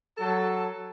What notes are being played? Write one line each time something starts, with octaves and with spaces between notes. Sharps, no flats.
F#3 A4